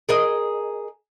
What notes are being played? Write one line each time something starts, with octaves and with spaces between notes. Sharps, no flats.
G#4 A#4 D#5